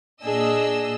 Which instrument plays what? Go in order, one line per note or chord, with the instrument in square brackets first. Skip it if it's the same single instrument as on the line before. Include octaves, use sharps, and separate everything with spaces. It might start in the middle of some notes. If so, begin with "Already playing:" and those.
[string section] A#2 D#5 E6 [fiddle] D4 G#4